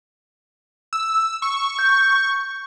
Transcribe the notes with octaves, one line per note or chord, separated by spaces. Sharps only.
E6
C#6
G6